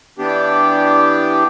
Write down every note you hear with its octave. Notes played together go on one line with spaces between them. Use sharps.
E3 B3 D4 G4